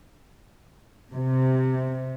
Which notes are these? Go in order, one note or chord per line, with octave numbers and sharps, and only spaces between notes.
C3